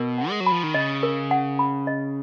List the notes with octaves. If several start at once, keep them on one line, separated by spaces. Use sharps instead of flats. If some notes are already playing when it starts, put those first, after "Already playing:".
Already playing: B2 A#4
F#5
G#3
F#3
B5
F3
D#3
C#3 D#5
A#4
F#5
B5
D#5